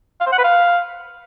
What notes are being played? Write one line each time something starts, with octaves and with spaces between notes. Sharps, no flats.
F5
C5
F#5
B4
F5